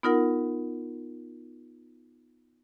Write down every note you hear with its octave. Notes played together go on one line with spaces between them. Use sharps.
B3 D#4 F4 A#4 F#5